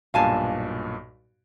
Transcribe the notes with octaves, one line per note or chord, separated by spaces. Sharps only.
B1 G2 A#2 F5 G#5 A5